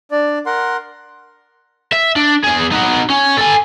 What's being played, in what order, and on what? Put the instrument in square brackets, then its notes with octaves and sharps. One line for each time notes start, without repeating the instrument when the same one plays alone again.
[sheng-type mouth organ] D4 D5
A#4 F#5 C6
[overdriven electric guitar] E5
D4
E2 G#4
D#4 F#4
C#4
A4 G#5